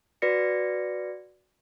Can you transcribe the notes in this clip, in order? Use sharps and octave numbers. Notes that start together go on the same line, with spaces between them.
F#4 B4 D5 A#6 C#7